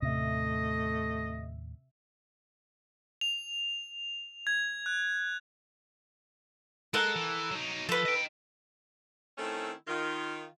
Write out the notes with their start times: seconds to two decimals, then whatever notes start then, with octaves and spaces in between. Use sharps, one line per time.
0.02 D#2 A2 C3 A3 C#4 D#5 E5
3.21 F7
4.47 G#6
4.86 F#6
6.94 G#3 A4 A#4 F#5
7.16 E3
7.51 F#3 D#4
7.89 F3 A4 B4
8.05 D#5 G5
9.38 D#3 A3 C4 C#4 E4 A4
9.87 D#3 F4